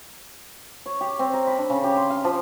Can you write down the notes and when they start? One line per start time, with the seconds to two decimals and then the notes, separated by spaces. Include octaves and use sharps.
0.86 C#5
1.01 G4
1.19 C4
1.33 A#4
1.47 B5
1.58 D4
1.70 C#3
1.84 G4
1.97 C6
2.10 F5
2.25 F3